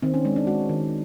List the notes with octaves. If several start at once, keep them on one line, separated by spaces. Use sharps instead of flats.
D#3 C4
C#4
G#3 D4
D4
G#3 F#4
D#3